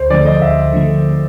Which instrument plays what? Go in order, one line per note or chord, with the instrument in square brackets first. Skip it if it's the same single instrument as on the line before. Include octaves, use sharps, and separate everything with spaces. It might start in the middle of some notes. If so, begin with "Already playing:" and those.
Already playing: [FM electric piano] D2 [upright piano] C5
[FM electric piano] D3 F3 A3 [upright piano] D5
[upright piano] D#5
[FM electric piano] D2 [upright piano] E5
[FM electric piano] D3 F3 A3